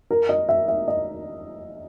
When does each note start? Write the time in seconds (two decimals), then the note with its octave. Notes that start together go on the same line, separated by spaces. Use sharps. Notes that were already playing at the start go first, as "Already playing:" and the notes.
0.11 A#4
0.29 D#5
0.49 E5
0.68 E5
0.88 D#5